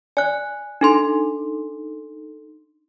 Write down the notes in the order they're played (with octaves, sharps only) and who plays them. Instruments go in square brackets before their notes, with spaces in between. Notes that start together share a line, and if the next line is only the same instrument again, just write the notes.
[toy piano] D5 [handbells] G#5 F#6
[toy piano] D4 [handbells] D#4 A4 C6